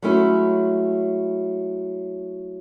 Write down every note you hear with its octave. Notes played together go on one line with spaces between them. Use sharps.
F#3 G#3 A3 C#4 E4